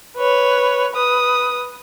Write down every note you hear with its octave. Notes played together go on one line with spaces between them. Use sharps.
B4 C#5
B4 D#6